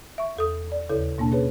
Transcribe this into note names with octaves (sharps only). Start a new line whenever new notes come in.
E5 C#6
E2 A4 D#6
D5
D#2 C#3 E4 A4 C#5
B2 A#3 D4 A5
C#4 G#4 B4 C#5